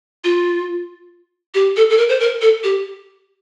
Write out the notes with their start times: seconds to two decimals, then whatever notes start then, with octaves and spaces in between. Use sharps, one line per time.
0.24 F4
1.55 G4
1.76 A4
1.90 A4
1.97 A#4
2.09 C5
2.20 A#4
2.42 A4
2.64 G4